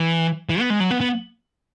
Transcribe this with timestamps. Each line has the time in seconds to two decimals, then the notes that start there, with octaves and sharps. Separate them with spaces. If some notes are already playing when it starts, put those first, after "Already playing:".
Already playing: E3
0.49 E3
0.60 B3
0.70 G#3
0.80 F#3
0.91 B3
1.01 B3